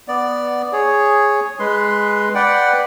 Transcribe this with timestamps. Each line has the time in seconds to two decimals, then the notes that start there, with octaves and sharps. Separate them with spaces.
0.08 B3 D5
0.73 G#4 C#5
1.59 G#3 B4 C6
2.35 B4 D5 F#5 G5